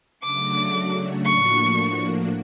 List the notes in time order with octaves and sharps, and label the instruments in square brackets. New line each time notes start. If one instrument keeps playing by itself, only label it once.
[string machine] C#3 F#3 A3 D4 F#4 [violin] D6
[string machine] A2 F3 A#3 D4 F#4 [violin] C#6